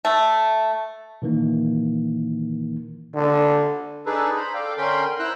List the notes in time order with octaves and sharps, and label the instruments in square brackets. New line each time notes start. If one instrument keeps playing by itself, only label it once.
[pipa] A3
[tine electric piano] A#2 D#3 E3 A#3
[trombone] D3
[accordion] D4 D#4 G#4 A4 B4
C5 A#5 B5
A4 D5 F5 G5
D3 C#4 A#4 G5 B5 C6
E4 C5 A#5 E6 F#6